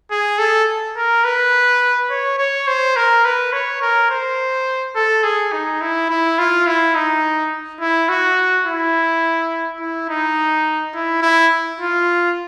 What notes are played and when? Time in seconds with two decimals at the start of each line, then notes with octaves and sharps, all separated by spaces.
0.11 G#4
0.39 A4
0.97 A#4
1.24 B4
2.10 C#5
2.39 C#5
2.67 C5
2.96 A#4
3.25 B4
3.53 C#5
3.82 A#4
4.10 C5
4.96 A4
5.23 G#4
5.53 D#4
5.81 E4
6.10 E4
6.39 F4
6.67 E4
6.95 D#4
7.81 E4
8.09 F#4
8.66 E4
9.80 E4
10.09 D#4
10.95 E4
11.22 E4
11.80 F4